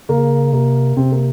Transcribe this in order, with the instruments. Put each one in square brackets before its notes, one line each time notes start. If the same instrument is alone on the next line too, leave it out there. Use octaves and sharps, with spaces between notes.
[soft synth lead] C#3 [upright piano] A#3
[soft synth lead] C3 [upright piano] A#3
[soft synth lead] C3 [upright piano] C4
[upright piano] A#3